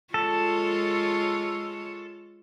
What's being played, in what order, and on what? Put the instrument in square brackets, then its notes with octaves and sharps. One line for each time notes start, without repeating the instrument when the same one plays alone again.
[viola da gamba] G#3 F4 C#5 [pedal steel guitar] A4